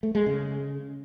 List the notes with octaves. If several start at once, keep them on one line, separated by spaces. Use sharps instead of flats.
A3
G#3
C#3